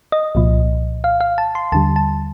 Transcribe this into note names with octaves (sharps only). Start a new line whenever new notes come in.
D#5
C2 A#2 F3
F5
F5
A5
C6
D#2 D3 G3 A5
A5